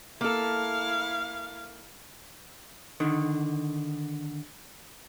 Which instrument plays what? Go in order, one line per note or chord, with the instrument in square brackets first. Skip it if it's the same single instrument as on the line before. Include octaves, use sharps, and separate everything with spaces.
[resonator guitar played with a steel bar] A#3 A4 [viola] E4 F5
[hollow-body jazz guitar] D3 D#3